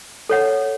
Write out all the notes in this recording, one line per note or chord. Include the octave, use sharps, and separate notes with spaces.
A4 C#5 F#5